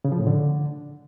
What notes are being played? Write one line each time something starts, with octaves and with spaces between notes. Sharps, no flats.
C#3
F3
A2
D3